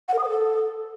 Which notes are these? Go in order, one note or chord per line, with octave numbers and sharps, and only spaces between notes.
F#5
A#4
D#6
C5
A4